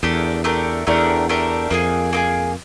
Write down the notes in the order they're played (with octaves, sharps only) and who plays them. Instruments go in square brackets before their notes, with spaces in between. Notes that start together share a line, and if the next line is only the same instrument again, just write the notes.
[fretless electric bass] E2 [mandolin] A3 D4 G4 A#4
[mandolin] A3 D4 G4 A#4
[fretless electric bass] E2 [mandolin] A3 D4 G4 A#4
[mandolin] A3 D4 G4 A#4
[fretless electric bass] F2 [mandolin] A#3 D#4 G#4
[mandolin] A#3 D#4 G#4